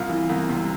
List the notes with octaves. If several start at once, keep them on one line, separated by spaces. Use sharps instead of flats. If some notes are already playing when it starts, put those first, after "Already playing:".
Already playing: C2 F4
E3
C2
C3